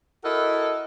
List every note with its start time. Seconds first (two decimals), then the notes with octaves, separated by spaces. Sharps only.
0.23 E4 F#4 A4 A#4 D#5